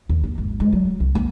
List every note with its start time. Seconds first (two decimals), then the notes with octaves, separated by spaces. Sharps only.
0.09 D#2
0.23 A#3
0.38 G#1
0.60 G#3
0.72 F#3
1.00 C2
1.15 A#3